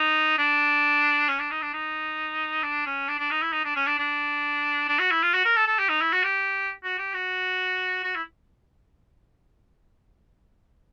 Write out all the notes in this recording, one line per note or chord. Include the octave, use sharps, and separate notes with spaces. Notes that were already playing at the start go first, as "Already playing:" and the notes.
Already playing: D#4
D4
C#4
D4
D#4
D4
D#4
D4
C#4
D4
D4
D#4
E4
D#4
D4
C#4
D4
D4
D4
F#4
E4
F4
F#4
A#4
A4
A4
G4
D#4
E4
F#4
G4
F#4
G4
F#4
F#4
E4